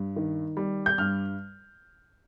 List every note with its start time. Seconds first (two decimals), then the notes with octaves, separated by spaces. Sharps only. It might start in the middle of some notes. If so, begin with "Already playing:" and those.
Already playing: G2
0.16 D#3
0.57 G3
0.86 G6
0.98 G2 F6